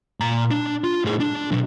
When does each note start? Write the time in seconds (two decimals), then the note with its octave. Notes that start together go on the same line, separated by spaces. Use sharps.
0.20 A#2 A#5
0.51 D4
0.84 F4
1.05 A2 G#4
1.20 D4
1.52 B2 F#3